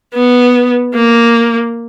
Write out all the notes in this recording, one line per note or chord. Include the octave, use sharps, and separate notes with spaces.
B3
A#3